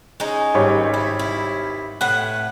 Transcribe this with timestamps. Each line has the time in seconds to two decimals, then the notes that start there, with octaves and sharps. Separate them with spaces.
0.20 G#3 C#4 D#4
0.54 G#1 G3 C#5
0.94 E4
1.19 E4
2.01 A2 B4 F#5